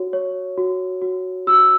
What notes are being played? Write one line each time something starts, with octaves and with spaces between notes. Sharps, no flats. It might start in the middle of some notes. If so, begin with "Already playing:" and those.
Already playing: F#4 C#5
C#5
F#4
F#4
F#4 E6